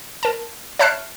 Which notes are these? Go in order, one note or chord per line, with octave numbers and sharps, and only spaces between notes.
A#4 A5
C#5 E5 A5 F6 F#6 C7